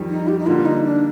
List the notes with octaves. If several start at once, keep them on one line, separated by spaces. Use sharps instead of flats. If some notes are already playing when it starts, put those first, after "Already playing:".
Already playing: F2 D#3 G3
D#4
G4
D#4
D3 G3 A#3 F4
D#4
D4